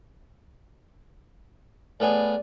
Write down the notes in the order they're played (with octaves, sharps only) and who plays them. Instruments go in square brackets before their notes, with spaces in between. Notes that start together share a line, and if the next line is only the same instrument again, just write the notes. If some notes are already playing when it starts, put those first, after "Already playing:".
[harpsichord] A2 B3 G#4 [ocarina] D5